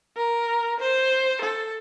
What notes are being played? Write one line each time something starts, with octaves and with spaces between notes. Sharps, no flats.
A#4
C5
A4